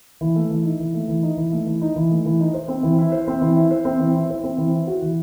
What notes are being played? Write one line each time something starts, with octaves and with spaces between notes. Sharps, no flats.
E3
A3
E3
D#4
E3
A3
E3
D#4
E3
A3
E3
D#4
E3
A3
E3
D#4
C5
C4
E3
E4
C5
C4
E3
E4
C5
C4
E3
E4
C5
C4
E3
E4
F#4
E3